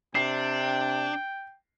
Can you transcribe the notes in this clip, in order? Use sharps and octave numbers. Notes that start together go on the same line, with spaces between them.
C3 D4 G5 C7